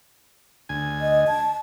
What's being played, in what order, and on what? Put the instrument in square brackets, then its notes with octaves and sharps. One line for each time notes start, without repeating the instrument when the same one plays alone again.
[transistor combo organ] D2 G#5
[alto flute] D#5
A5